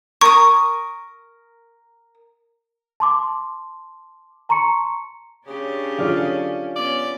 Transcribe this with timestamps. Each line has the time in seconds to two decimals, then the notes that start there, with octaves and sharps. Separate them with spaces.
0.21 A#4 C#6 D#6
3.00 A5 C6 D6
4.49 A5 A#5 C6 C#6 C#7
5.47 C#3 C#4 D4 G4
5.98 D3 F#3 F4 G#4 D5 F5
6.76 B3 C#4 D5